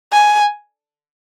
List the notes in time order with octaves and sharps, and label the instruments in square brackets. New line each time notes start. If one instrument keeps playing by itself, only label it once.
[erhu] G#5